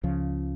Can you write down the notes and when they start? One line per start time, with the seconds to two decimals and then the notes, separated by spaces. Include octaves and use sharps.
0.03 C#2 C#3 F3